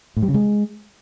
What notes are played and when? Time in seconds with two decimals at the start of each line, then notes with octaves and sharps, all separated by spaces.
0.17 A2
0.22 G3
0.28 C#3
0.34 G#3